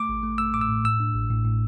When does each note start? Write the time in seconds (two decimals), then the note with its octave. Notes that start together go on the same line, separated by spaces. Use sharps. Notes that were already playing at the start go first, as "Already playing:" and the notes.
Already playing: A3 D6
0.09 A1
0.23 A3
0.38 A3 E6
0.54 A2 D6
0.61 E6
0.69 A2
0.84 A2 E6
1.00 D4
1.15 A1
1.30 A2
1.45 A2